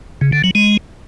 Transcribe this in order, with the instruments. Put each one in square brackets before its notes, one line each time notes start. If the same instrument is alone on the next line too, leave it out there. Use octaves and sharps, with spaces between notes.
[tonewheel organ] C#3
D3
F#3
G#3